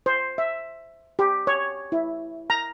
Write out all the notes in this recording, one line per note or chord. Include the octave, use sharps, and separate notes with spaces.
C5
E5
G4
C#5
E4
A#5